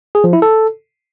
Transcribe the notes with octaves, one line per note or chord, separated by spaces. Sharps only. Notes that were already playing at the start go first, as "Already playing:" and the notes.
G#4
F3
E4
A4